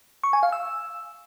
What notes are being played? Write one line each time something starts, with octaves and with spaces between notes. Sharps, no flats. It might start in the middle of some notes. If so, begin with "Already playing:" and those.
C#6
G#5
F5
E6